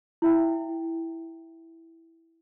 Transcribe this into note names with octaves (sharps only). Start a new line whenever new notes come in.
E4 E5 G5